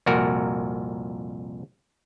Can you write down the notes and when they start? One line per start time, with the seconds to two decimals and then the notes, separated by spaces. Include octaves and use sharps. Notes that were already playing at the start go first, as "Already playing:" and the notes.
0.06 C2 F2 A#2 F#4 A#4